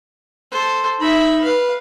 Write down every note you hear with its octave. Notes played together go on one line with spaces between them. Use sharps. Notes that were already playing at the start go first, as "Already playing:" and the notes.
A4 C5
D#4 E5 B5
B4 F5